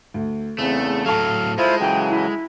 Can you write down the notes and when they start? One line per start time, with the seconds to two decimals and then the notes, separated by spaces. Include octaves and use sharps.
0.14 D2
0.58 E2 C#3 A3 C4
1.06 A2 F#3 A4 F5 A5
1.58 G#3 E4 F4 C5
1.80 C#3 E3 F#3 G5
2.10 E4